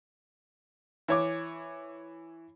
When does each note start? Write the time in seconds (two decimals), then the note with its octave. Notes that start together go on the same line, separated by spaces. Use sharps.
1.08 E3 C#5 D6